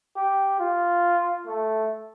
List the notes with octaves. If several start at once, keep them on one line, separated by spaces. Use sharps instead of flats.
G4
F4
A3